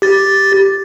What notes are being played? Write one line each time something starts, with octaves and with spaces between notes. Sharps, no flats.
G4 A6